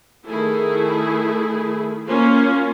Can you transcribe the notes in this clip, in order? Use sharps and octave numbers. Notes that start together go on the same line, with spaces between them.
D#3 A3 E4 G#4
A#3 C#4 F4